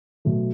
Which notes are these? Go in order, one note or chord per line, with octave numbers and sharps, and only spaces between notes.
B2 F#3 A3